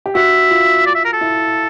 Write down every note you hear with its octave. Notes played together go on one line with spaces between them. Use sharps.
G4
F#4 E5
F4
D5
E5
A#4
A4
E4